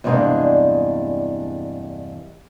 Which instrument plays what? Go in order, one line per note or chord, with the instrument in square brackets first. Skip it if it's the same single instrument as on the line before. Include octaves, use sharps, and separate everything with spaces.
[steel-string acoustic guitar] E2 G2 C3 G#3 A#3 D4